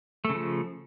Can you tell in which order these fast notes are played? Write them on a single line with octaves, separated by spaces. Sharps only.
A3 C#3 F3